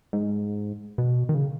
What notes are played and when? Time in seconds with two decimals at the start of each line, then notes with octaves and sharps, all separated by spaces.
0.13 G#2
0.98 B2
1.29 D#3
1.35 C#3